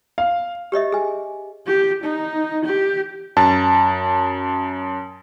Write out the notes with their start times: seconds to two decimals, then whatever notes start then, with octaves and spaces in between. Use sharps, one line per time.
0.18 F5
0.72 G4 C#5 D#5 E5
0.92 G#4 G#5
1.67 G4
2.04 D#4
2.65 G4
3.37 F#2 A5